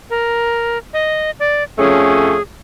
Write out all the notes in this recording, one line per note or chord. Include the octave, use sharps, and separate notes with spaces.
A#4
D#5
D5
F2 A3 C#4 G#4